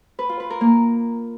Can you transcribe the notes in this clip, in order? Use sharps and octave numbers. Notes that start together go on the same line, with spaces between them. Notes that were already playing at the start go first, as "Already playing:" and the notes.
B4
F4
B4
A#4
A#3